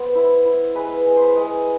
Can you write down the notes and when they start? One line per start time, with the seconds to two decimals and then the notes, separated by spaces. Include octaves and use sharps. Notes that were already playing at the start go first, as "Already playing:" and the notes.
Already playing: B3 C5
0.15 E4
0.45 E4
0.75 G#3 B4
1.06 G#3
1.16 B4 C5
1.36 G#3